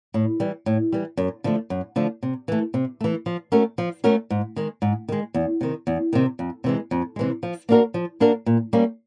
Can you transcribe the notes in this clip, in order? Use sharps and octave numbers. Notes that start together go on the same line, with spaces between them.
A2
E3 G3
A2
E3 G3
F#2
D3 F3 A3
F#2
D3 F3 A3
C3
E3 A3
C3
E3 A3
F3
A3 C#4 F#4 A#4
F3
A3 C#4 F#4 A#4
G#2
D#3 G#3
G#2
D#3 G#3
E2
C3 D#3
E2
C3 D#3
F2
C3 E3 G#3
F2
C3 E3 G#3
F3
A#3 D4 F#4 A#4
F3
A#3 D4 F#4 A#4
A#2
G3 A#3 C#4